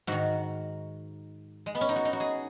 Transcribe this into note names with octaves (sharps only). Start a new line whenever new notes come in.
G#2 D#3 F#4
G#3
B3
C#4
D#4
F#4
D#4
F#4
G#4